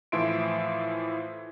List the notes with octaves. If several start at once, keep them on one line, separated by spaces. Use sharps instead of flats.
A2 E3 F3 E5 C6 D7